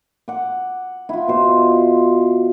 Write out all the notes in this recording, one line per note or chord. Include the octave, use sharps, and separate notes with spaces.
F#5 D6
E4 F4
B2 C5